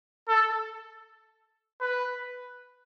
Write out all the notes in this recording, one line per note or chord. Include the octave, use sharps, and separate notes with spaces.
A4
B4